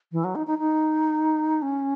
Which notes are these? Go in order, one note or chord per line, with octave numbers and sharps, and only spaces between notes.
E3
F#3
D#4
D#4
D#4
C#4